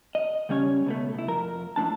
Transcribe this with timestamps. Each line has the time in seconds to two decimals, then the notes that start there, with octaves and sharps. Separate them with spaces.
0.15 D#5
0.49 C#3 G3 C#4 C#5
0.86 C#2 B2 A3
1.14 C2 E4
1.28 F2 A#4
1.76 F2 A2 D4 A5